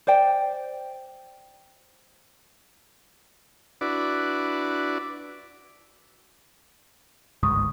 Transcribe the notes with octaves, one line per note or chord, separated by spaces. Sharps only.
C5 D5 G5
D4 E4 F#4 B4 D5
G1 C#2 G#2 C#6 D#6